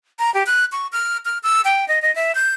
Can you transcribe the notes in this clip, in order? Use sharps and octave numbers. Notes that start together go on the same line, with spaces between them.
A#5
G4
F#6
C#6
F6
F6
E6
G5
D#5
D#5
E5
G6